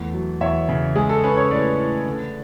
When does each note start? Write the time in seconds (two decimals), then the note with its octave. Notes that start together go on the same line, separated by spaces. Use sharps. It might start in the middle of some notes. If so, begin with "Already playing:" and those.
Already playing: E2 A3
0.14 F#3
0.41 E2 C#5 E5
0.69 C#3
0.96 G#3 G#4
1.09 A4
1.23 C#4 B4
1.37 C#5
1.51 A2 B4 D5
1.78 A2
2.06 D3